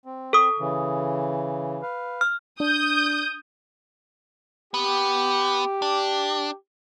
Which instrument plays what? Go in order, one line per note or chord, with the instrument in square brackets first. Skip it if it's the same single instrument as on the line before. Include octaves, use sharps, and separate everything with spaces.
[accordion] C4
[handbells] A4 D#6
[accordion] C#3 E3
B4 F5
[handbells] F6
[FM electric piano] D4 [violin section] D#6 G6
[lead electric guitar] B3 [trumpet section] G4
[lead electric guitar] D4